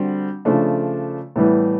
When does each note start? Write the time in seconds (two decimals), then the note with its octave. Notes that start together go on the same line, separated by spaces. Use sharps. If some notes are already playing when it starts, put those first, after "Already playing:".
Already playing: D3 G3 C4 F#4
0.45 C#3 F3 A3 D4
1.36 A2 E3 G3 B3